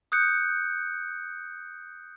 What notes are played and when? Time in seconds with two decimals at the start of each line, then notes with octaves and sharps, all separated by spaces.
0.12 D#6 F#6 G6 C#7